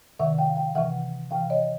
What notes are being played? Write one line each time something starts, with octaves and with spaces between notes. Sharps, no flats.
C3 D#3 E5 F#5
F5 G5
F5 G5
C3 E3 E5 F#5
C3 E3 F5 G5
C#5 D#5